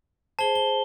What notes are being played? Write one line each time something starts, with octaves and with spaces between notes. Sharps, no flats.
G#4 C5 A5 G7
G7